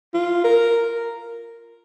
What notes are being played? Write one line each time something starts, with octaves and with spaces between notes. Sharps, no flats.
F4
A#4